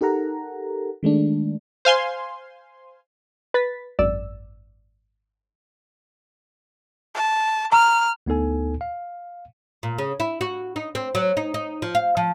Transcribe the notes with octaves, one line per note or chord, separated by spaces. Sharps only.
D#4 G4 A4 A#4 F#5 A#5
D#3 G#3 A3 D4
C5 F5 G#5 C6
B4 A6 B6
G#1 F#2 D5 E6
A5
A#5 F6
D2 B3 D#4 A4 G#5
F5
A#2
C#3
E4
F#4
D#4
C4
F#3
D#4
D#4
F3
F5
F3